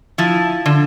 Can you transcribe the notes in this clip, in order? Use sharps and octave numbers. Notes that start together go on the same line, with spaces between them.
F3 E4
D3